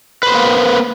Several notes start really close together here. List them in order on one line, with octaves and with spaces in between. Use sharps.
B4 C5 B3 A#3